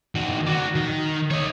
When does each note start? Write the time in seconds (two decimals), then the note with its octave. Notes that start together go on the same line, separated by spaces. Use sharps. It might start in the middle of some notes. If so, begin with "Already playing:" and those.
0.15 D#3 F#4
0.47 F#4 D5
0.75 D#3
1.31 C#5 D#5